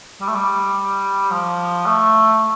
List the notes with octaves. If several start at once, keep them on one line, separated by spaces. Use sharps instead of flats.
G3
A3
G3
F3
A3